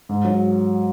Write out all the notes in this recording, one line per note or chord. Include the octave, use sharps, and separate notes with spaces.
G#2
F#3